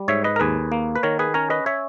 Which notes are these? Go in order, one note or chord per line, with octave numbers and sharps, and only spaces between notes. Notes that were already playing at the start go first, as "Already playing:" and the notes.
Already playing: G3
G#2 C#5 E5
B4 D#5
A#4
D#2 G#4 B4
A#3
B4
D#3 A#4 C#5
G#4 B4
C#4 A#4 C#5
B4 D#5
C#5 E5